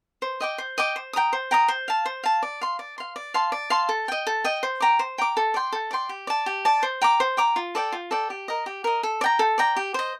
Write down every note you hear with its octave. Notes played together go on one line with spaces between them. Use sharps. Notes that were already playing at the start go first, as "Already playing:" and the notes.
C5
D#5 G5 D6
C5
D#5 G5 D6
C5
G5 A#5 D#6
C5
G5 A#5 D#6
C5
F5 A5
C5
F5 A5
D5
F5 C6
D5
F5 C6
D5
F5 A5 C6
D5
F5 A5 C6
A4
D#5 G5
A4
D#5 G5
C5
G5 A#5 D6
C5
G5 A#5 D6
A4
D5 G5 C6
A4
D5 G5 C6
G4
D5 A5
G4
D5 A5
C5
G5 A#5 D6
C5
G5 A#5 D6
F4
A4 D5 G5
F4
A4 D5 G5
G4
A#4 D#5
G4
A#4 D#5
A4
D5
G5 A#5
A4
D5 G5 A#5
G4
C5 D#5